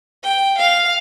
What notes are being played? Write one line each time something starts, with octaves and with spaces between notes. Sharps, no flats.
G5
F5